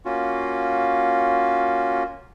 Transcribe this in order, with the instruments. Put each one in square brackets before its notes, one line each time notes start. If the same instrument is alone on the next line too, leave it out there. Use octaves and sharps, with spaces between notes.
[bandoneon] A#3 C#4 F4 F#4